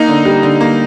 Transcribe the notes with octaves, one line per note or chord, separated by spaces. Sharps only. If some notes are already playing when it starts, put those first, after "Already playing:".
Already playing: A#3 D#4
D3
G3
D3
A#3